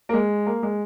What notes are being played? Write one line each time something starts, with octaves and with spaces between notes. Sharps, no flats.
A#3
G#3
A#3
G#3